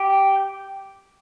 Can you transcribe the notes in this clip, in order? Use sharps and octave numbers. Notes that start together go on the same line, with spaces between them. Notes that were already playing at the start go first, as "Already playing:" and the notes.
Already playing: G4